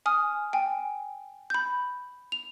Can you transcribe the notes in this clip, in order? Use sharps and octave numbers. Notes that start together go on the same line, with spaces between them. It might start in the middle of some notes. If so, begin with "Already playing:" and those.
G#5 D#6 F6
G5 G#5
B5 G6
F7